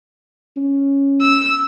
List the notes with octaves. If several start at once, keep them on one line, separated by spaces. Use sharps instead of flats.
C#4
E6